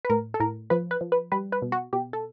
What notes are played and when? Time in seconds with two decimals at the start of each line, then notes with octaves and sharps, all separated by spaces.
0.05 B4
0.10 A2 A#4
0.34 A4
0.40 A2 A#4
0.70 F3 B4
0.91 B4
1.01 F3
1.12 B4
1.32 G3 B4
1.52 B4
1.62 B2
1.72 F#4
1.93 B2 G4
2.13 A4